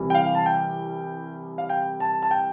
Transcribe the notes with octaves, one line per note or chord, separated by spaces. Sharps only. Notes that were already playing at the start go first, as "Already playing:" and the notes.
Already playing: C2 C3 E3 G3
G5
F5
A5
G5
F5
G5
A5
A5
G5